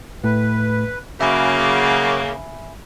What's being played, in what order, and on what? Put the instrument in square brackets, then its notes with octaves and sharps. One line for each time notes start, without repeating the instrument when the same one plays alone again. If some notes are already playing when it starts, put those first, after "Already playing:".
[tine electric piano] A2 A3 [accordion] B4
[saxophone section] C#3 A#3 [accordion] F#3 F#4 D6 [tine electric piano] E5 G#5 B5